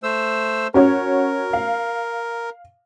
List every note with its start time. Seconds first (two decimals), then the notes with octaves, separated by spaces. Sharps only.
0.03 A3 C5 E6
0.74 C#4 F#4 A#4 C#5
1.53 F5